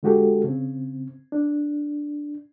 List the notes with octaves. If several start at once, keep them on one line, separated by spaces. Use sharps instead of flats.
D3 G#3 F#4 G4 A4
C#3 C4
D4